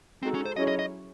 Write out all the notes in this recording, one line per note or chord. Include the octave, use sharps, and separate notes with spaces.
G#3 C4 D#4 F#4 A4
C#4
C5
F#3 C#4 E4 G#4 C#5 D#5
D#5
D#5